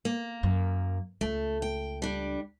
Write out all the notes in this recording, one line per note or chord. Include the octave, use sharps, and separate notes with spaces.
A#3
F#2
C#2 A3
G5
G3 D4